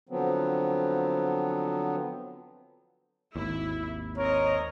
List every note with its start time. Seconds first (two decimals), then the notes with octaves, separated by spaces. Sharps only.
0.09 D3 F3 F#3 B3 C4
3.36 G#1 D#2 A#3 E4
4.17 C4 A#4 C#5 D#5